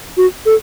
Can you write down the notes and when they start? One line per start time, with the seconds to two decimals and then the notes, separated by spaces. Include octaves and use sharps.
0.17 F#4
0.46 A4